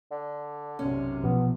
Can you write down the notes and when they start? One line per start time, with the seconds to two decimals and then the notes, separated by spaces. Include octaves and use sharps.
0.11 D3
0.79 B1 F#2 C3 C#4
1.23 B2 F3 B3